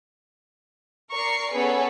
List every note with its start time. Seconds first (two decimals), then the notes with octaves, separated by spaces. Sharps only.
1.12 A#4 D5 C#6 C7
1.53 B3 C#4 G#4 A4 B4 C#5